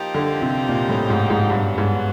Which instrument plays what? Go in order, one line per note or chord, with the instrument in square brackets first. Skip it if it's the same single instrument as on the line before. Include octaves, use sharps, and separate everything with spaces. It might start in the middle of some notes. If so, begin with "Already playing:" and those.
Already playing: [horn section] F3 A#3 D#4 G4
[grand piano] D3
C3
A#2
A2
G#2
G#2
[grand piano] G2 [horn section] D3 F#3 B3
[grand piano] G#2